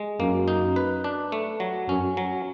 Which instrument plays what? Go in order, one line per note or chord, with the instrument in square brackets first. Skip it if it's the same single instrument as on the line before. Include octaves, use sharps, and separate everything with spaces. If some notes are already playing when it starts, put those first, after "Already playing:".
Already playing: [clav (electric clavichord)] G#3
[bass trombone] F#2 [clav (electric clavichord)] A#3
[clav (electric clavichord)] D#4
B4
D4
A3
F#3
[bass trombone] F#2 [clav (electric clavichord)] C#4
[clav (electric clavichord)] F#3